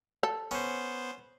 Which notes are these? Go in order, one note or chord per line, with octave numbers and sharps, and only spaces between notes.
A4
B3 C#4 C5